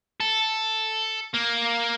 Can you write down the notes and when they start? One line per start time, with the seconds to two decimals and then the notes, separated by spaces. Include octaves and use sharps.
0.20 A4
1.34 A#3